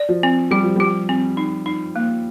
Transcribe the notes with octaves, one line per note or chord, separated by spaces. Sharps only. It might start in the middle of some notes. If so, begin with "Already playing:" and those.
Already playing: D5
F3
C4
G3 G4
F3
G3 G4
C4
D#4
D#4
A#3